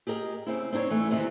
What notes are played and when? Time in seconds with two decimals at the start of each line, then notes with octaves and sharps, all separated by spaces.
0.07 G4 G#4 A#4 D#5
0.46 C#3 C4 E4
0.72 C4 D4 D#4 C5 C#5
0.90 E3 A3
1.10 E2 G2 C3 D#3 E3